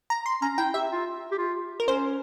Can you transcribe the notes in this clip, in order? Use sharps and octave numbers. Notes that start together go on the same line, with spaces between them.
A#5
C6
C#4 A#5
E4 G5
G4 E5
F4
G4
F4
A#4
C#4 C5